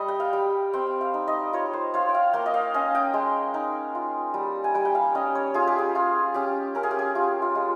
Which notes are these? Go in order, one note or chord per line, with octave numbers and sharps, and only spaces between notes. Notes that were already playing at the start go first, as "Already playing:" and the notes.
Already playing: G3 D#5
G5
F5
G3
C4 G5
F5
D#4
D#5
F4 C#5
C5
F4 C#5
G5
F5
A#3 G5
D#5
F5
C#4 D#5
G5
G#3
D#4
F4
G3
G#5
G3 G5
G5
F5
C#4 D#5
C#5
F4 G#4
G4
G#4
F4
C#4 G4
C#4 A#4
G#4
G4
G#4
F4 G4
F4
G#3